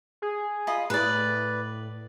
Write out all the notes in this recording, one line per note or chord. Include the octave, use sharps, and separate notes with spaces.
G#4
F4 D#5 B5
A2 B4 D5